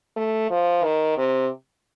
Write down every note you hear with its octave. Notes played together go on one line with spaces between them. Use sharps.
A3
F3
D#3
C3